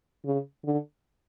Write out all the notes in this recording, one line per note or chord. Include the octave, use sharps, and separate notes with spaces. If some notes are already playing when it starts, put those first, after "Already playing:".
C#3
D3